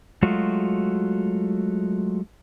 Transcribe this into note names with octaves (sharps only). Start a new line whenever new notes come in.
F#3 G#3 A3 F4 F#4